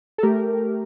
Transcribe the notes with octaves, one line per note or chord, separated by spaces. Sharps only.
A4
A3 G4 A#4